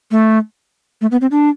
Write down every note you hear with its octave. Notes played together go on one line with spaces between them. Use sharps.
A3
A3
B3
C4
D4